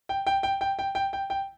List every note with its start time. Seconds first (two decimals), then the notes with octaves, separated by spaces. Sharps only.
0.09 G5
0.27 G5
0.43 G5
0.61 G5
0.79 G5
0.95 G5
1.13 G5
1.30 G5